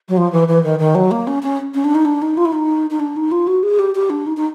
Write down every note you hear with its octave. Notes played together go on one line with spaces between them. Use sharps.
F#3
F3
E3
E3
D#3
D#3
F#3
A#3
C#4
C#4
C#4
D4
D#4
D4
D#4
F4
E4
D#4
D#4
D4
D#4
F4
F#4
G#4
G4
G4
D4
D#4
D#4